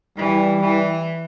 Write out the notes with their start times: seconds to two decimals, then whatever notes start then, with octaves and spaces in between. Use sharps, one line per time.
0.17 E3 G3
0.62 E3